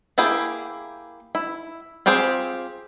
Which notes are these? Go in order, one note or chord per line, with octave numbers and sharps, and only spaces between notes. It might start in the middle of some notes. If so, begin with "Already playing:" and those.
A#3 E4 G4 G#4
E4
C4 F4 G4 G#4 C5